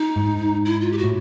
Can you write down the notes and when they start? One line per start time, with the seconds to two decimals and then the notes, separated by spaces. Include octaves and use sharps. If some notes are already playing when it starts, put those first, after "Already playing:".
Already playing: D#4
0.16 G#2
0.65 E4
0.81 F4
0.92 G4
0.98 F#4
1.04 A2